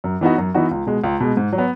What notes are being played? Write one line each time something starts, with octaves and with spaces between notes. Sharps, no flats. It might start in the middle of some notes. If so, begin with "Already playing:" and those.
F#2
E3 B3 D#4 F#4
F#2
E3 B3 D#4 F#4
C#2
B2 G#3
C#2
B2 G#3
G#2
F#3
B3